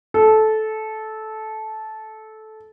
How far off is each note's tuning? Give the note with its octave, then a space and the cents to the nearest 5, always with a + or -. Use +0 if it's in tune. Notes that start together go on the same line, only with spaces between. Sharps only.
A4 -15